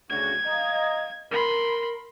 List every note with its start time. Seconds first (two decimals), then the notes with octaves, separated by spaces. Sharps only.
0.10 D2 C#3 F#4 G#6
0.46 D#5 F5 A#5
1.31 A#4 B5 C6